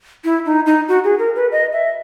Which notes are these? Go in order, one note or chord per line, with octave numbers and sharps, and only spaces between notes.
E4
D#4
D#4
F#4
G#4
A#4
B4
D#5
E5